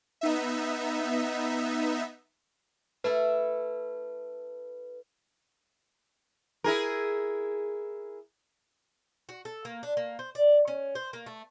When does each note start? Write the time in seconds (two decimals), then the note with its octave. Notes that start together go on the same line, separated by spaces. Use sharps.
0.21 B3 D#4 E5
3.04 A3 E4 A4 B4
6.64 E4 G#4 A#4
9.29 F#4
9.45 A4
9.65 A#3
9.83 D4
9.97 A#3
10.19 C5
10.35 D5
10.68 C#4
10.95 C5
11.13 A#3
11.26 A3